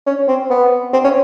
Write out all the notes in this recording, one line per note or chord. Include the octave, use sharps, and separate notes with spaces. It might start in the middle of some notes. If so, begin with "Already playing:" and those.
C#4
C4
B3
C4
C#4